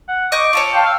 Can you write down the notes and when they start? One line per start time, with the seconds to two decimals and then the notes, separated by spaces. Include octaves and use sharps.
0.09 F#5
0.32 D#5 C#6 D6 G6
0.53 F4 A4 C#5
0.73 F5 G5 A5 C6
0.85 F5 E6